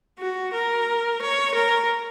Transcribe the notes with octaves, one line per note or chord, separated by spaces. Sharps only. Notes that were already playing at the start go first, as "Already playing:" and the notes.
F#4
A#4
C#5
A#4